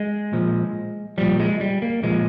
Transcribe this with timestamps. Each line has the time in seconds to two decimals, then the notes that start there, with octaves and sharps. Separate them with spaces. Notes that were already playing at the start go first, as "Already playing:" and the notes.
Already playing: G#3
0.33 A#2 F3
1.18 A#2 F3 G3
1.40 G#3
1.61 G3
1.82 A#3
2.03 A#2 F3 G#3